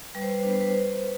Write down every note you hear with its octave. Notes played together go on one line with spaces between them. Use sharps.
G3 B4
C5
B4
C5
B3 D4 B4
C5
B4
C5